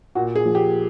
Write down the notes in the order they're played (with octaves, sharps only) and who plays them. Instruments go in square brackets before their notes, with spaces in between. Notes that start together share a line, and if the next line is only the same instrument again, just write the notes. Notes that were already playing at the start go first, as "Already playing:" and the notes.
[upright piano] A#2 F#4
G#4
F3
G4